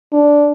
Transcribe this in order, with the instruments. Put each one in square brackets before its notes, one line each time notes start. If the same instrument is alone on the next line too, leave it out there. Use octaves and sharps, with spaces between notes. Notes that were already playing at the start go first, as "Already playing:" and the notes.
[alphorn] D4